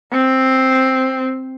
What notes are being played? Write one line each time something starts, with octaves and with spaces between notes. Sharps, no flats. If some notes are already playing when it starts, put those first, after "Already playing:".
C4